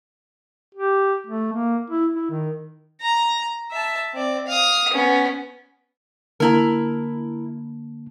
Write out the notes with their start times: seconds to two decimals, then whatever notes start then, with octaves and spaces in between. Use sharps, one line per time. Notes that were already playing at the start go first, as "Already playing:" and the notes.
0.74 G4
1.27 A3
1.52 A#3
1.90 E4
2.15 E4
2.30 D#3
3.01 A#5
3.71 E5 A5
4.13 C4 D5
4.47 F5 D#6
4.93 B3 C#4
6.40 D3 A#3 E4 A#4 A5